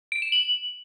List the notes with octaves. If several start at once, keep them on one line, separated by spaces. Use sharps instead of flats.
D7
E7
F#7